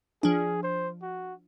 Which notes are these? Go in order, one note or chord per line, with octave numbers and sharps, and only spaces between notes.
F3 D4 G#4
C5
F#4